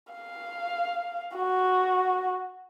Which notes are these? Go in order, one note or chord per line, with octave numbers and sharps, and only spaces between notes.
F5
F#4